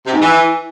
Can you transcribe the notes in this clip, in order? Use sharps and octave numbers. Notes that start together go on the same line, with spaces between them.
C3
G#2
E3